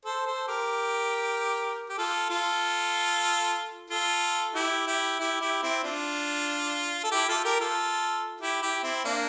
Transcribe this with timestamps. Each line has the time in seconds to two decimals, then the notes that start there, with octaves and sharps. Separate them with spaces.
0.05 A4 C5
0.27 A4 C5
0.48 G4 A#4
1.90 G4
1.98 F4 A4
2.30 F4 A4
3.90 F4 A4
4.55 E4 G4
4.87 E4 G4
5.20 E4 G4
5.41 E4 G4
5.62 C4 E4
5.83 D4 F4
7.04 A4
7.12 E4 G4
7.28 F4 A4
7.45 G4 A#4
7.60 F4 A4
8.41 E4 G4
8.62 E4 G4
8.84 C4 E4
9.05 A#3 D4